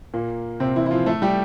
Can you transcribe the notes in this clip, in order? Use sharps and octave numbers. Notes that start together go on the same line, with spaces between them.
A#2 A#3
C3 C4
E3 E4
E4
F3 F4
A3 A4
G3 G4